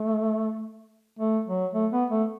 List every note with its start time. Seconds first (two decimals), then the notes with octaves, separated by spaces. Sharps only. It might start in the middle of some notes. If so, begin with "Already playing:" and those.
Already playing: A3
1.19 A3
1.47 F#3
1.74 A3
1.92 B3
2.10 A3